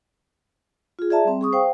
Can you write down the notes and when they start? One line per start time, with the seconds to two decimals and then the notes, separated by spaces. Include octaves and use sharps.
0.99 F4 G#4
1.10 G#4 D5 E5 A5 A#5
1.25 G3 C4
1.41 G#4 C#6 D#6
1.53 C5 F5 G5